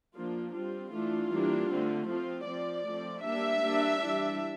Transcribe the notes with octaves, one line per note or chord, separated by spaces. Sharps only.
F3 A#3 D4 F4
G3 C4 F4
E3 A3 D4 F4
E3 G3 A#3 D4
D3 A3 C4
F3 C4 F4
F3 C4 D5
F3 A3 C4
G3 A#3 D4 E5
G3 A#3 D4
E3 G3 D4